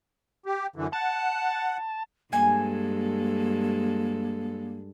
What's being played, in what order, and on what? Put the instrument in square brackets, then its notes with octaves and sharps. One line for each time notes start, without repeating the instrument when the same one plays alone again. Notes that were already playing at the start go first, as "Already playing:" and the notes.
[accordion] G4
F#2 D3 E3
[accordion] F#5 [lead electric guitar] A5
[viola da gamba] G2 G#3 A4 [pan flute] A#3 [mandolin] G#5